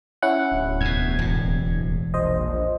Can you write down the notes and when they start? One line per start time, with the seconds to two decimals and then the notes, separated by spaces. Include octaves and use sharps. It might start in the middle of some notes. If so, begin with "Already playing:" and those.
0.22 C#4 E4 F#5
0.51 D1
0.81 E2 B2 G#6
1.19 E1 A2
2.14 A#1 C5 D#5